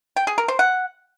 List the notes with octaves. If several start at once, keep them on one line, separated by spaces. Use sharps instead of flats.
G5
G#4
A#4
C5
F#5